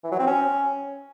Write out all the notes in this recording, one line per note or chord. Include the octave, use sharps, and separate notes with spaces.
E3
F#3
C4
C#4